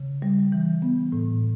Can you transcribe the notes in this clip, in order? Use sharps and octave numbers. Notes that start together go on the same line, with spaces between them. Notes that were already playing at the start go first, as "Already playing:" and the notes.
Already playing: C#3
G3
E3
B3
A2